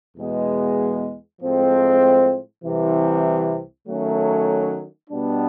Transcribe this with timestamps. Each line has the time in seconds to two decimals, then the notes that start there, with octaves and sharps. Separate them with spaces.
0.16 E2 B2 G#3 B3
1.40 A2 F3 G#3 C4
2.63 C2 C3 E3
3.87 D#3 F#3 A3 C#4
5.09 B2 G3 B3 D4